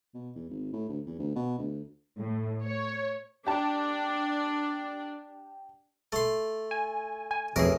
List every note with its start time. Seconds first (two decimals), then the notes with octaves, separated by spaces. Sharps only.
0.14 B2
0.35 E2
0.50 G#1
0.73 A2
0.89 D2
1.06 E2
1.19 D2
1.36 B2
1.59 D2
2.18 A2
2.63 C#5
3.47 D4 G4 A5
6.12 A3 C6
6.71 G#5
7.31 G#5
7.56 A1 F2 G#4 A#4 E5